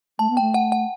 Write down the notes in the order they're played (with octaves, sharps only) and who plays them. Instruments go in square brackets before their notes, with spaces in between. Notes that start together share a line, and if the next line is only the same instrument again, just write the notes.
[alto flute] A3 [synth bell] A5
[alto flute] B3
[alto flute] A3 [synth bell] G5
[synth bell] F#5
F#5